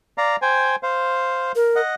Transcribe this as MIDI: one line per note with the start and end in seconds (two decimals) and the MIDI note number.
0.18 0.36 74
0.18 0.36 77
0.18 0.36 82
0.42 0.76 72
0.42 0.76 79
0.42 0.76 80
0.83 1.52 72
0.83 1.52 77
1.56 1.80 70
1.76 1.95 75
1.76 1.95 78